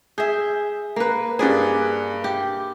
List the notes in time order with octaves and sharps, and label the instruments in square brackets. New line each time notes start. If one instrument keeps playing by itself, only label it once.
[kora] G#4 E5 [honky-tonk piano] G6
[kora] A#3 B4
[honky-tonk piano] G2 B4 [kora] G#4 D5
[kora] G4